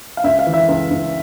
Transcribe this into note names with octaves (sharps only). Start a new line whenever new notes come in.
F5
C#2 E5
F5
E3
E5
C#2
C#2